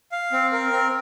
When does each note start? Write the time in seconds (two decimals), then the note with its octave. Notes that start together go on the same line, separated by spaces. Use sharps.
0.12 F5
0.32 C4
0.52 A#4
0.72 C4